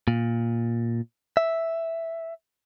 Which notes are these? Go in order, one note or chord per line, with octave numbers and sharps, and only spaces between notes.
A#2
E5